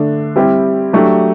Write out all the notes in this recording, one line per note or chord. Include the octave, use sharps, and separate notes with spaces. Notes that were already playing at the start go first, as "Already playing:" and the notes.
Already playing: D3 A3 D4
G3 C4 E4 G4
F#3 A3 D4 G4